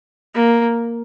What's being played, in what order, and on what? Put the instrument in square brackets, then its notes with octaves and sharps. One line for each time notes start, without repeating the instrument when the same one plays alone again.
[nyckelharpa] A#3